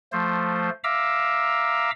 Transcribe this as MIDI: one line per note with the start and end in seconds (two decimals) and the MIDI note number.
0.12 0.70 53
0.12 0.70 57
0.12 0.70 72
0.84 1.91 76
0.84 1.91 77
0.84 1.91 82
0.84 1.91 86
0.84 1.91 88